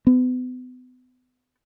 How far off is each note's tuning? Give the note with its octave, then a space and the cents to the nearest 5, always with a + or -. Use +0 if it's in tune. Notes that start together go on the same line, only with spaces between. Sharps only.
B3 +35